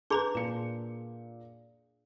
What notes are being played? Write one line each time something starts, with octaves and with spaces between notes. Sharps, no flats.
D4 G#4 B4 A5 A#5 C6 D6 G6
A#2 A5 C#7